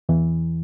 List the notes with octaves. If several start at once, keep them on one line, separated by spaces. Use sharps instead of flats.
E2 E3